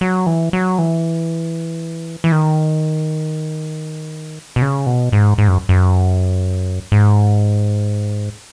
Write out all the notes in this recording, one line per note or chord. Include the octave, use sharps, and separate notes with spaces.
F#3
E3
F#3
E3
E3
D#3
B2
C#3
B2
G#2
G#2
F#2
F#2
G#2